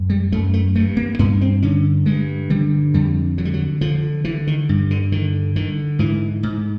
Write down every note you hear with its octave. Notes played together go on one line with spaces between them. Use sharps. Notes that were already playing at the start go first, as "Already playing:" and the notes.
Already playing: F#2
G3
F#2 A3
A3
G2 A3
A#3
G2 B3
C4
D3 C#4
G2 G#3
D3 G3
F2 G3
D3 F#3
G3
F#3
D3 F3
D3 E3
D#3
G2
D3
D3 D#3
D3 D#3
G#2 E3
G#2